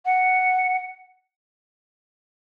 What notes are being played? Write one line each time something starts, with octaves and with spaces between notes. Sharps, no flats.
F#5